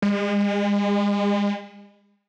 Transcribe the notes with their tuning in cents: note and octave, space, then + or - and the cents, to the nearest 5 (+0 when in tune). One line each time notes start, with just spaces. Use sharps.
G#3 -40